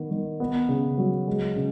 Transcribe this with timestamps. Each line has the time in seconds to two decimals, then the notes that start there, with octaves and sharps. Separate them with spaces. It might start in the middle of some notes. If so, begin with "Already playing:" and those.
Already playing: D#3 B3
0.11 D#3
0.40 B3
0.69 C#3
0.98 F#3
1.28 G#3
1.56 C#3